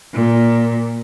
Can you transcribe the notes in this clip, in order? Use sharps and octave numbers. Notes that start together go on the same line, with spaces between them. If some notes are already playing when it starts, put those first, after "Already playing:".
A#2